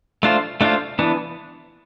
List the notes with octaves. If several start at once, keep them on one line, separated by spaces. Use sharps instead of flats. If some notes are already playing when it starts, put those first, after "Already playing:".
A3 D4 F4 C5
A3 D4 F4 C5
E3 B3 D4